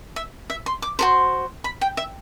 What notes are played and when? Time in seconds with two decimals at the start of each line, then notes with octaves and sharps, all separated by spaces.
0.16 E5
0.50 E5
0.66 C6
0.82 D6
0.99 F#4 A4 C5 C6
1.64 B5
1.81 G5
1.97 E5